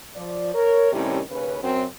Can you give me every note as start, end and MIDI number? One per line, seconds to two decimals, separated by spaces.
0.16 0.49 53
0.16 0.49 74
0.54 0.91 70
0.54 0.91 73
0.93 1.20 45
0.93 1.20 48
0.93 1.20 51
0.93 1.20 55
0.93 1.20 61
0.93 1.20 64
1.30 1.59 39
1.30 1.59 49
1.30 1.59 61
1.30 1.59 71
1.63 1.85 42
1.63 1.85 60